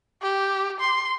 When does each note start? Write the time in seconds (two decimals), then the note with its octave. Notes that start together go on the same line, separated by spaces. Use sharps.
0.22 G4
0.80 C6